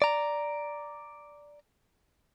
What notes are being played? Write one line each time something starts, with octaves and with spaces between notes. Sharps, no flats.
D5 A#5